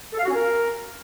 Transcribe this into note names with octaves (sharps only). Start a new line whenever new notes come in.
A4
F5
F#4
C#4
A#4